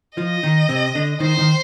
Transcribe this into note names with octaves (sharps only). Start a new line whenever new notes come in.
F3 F4 D#5
D#3 D#4
C3 C4
D3 D4
D#3 D#4 C5
D#3 D#4